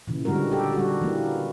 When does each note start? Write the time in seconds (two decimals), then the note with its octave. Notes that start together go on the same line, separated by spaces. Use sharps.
0.07 A#2 C#3 E3
0.25 D3 G3 G#3 F#4 A#4
0.51 G4 A4
0.73 G3 F#4
1.02 E3 A#3